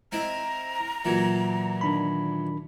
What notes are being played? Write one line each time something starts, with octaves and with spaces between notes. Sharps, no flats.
C4 E4 D#5 A#5
A#2 E3 F#3
D#3 D4 B5